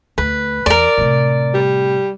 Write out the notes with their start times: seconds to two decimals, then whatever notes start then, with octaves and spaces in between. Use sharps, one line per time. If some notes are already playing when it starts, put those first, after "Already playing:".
0.18 D2 B4
0.66 E2 A#4 D5
0.98 A2 C3
1.54 G3